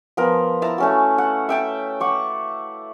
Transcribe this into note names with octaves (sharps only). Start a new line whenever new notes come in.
F3 B3 A#4
E4 A5 A#5
A3 C#4 F#4
F#5
E5 G5 A5
F#5 C#6 D6